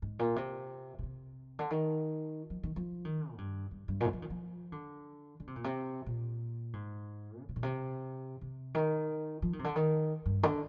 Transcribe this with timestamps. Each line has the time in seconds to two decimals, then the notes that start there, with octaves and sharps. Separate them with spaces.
0.02 G#2
0.19 A#2
0.36 C3
0.99 A#2
1.03 C3
1.59 D3
1.70 D#3
2.50 F3
2.63 D#3
2.76 F3
3.05 D#3
3.33 G#2
3.38 G2
3.71 G2
3.88 G2
4.00 A#2
4.06 G#2
4.13 F3
4.22 D#3
4.30 F3
4.72 D3
5.40 D3
5.47 C3
5.56 A#2
5.64 C3
6.06 A#2
6.73 G#2
7.41 D3
7.49 C3
7.56 A#2
7.63 C3
8.41 C3
8.75 D#3
9.42 F3
9.53 D#3
9.59 C3
9.64 D3
9.76 D#3
10.26 G2
10.43 D3